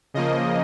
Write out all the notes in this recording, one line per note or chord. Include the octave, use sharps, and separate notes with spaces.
C#3 F3 A#3 D#5